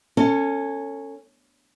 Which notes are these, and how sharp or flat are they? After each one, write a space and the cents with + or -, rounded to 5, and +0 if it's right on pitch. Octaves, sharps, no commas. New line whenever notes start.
C#4 -5 A4 +25